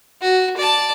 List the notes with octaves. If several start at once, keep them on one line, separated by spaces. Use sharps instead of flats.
F#4
D5 A5